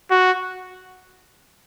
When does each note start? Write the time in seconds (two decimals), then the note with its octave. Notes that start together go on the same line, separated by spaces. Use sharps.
0.11 F#4